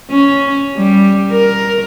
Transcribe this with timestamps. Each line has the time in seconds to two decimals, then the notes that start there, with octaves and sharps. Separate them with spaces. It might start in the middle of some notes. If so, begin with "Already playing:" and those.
0.11 C#4
0.77 G3
1.32 A#4